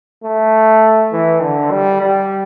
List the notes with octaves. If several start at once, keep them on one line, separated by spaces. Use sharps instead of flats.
A3
E3
D3
G3
G3